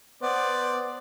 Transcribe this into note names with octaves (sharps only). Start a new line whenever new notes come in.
B3 C5 D5